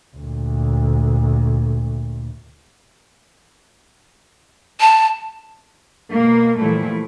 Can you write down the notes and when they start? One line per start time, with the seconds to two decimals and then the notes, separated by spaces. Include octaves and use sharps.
0.17 D2 A#2
4.80 A5
6.11 B2 A#3
6.58 A#2 E3 F3 G3 A3 E4